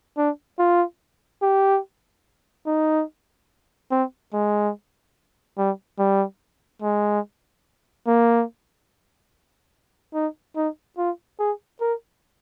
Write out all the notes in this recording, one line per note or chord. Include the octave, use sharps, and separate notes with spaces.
D4
F4
G4
D#4
C4
G#3
G3
G3
G#3
A#3
D#4
D#4
F4
G#4
A#4